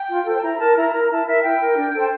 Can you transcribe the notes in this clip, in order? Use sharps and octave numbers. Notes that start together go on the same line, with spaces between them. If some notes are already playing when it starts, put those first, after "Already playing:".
Already playing: G5
F4
A4 C5
A5
E4 A#5
A#4 A5
E4 A#5
A#4 A#5
E4 A5
A#4 E5
E4 G5
A#4
D4
A4 C5